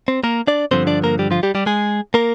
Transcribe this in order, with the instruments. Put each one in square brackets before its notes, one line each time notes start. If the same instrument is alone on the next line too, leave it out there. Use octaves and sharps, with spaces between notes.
[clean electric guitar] C4
A#3 A#4
D4 D5
G2 D3 F3 C4 C5
D4 D5
A#3 A#4
G3 G4
F3 F4
G3 G4
G3 G4
G#3 G#4
A#3 A#4